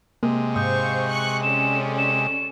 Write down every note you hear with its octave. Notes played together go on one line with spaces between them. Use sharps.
C3 G#3 A#3
G#2 C5 D#5 F5 C#6 D#6 G6
C#6 F#6 C#7
C#4 A4 D5 E7
E7